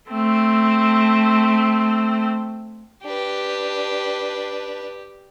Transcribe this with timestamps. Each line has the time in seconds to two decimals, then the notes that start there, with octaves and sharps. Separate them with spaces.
0.10 A3 C4
3.05 D4 G4 B4